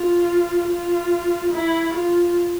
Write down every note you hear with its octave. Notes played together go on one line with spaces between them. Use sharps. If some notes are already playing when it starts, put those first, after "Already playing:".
Already playing: F4
F4
E4
F4